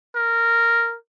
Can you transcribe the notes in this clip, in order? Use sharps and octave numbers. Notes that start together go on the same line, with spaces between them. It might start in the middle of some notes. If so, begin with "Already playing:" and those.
A#4